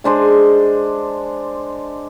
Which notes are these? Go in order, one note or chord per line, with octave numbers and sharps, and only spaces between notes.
G#3 D4 C5 G#5